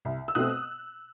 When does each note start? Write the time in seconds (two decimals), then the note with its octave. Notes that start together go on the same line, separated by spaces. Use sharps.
0.05 C2
0.28 E6
0.35 B2 A3 C4 D#6 F#6